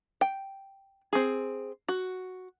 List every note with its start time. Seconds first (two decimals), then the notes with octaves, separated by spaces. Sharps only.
0.21 G5
1.13 C4 G#4
1.88 F#4